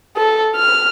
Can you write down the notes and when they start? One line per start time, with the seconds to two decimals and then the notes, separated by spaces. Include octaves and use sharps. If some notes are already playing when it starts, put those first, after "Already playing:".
0.16 A4
0.56 F6